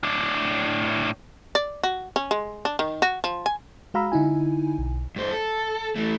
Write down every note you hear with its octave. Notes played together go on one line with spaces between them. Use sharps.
A2 D4
D5
F#4
C#4
G#3
D4
D#3
F#4
F3
G#5
G#3 F#4 F5 A#5 B5 E6
D3 D#4 E4 G#5
B1
G2 C5
A4
E3 A3